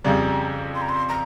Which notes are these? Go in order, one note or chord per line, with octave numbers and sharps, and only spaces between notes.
F2 C#3 G3 A#5
C6
A#5
C6
A#5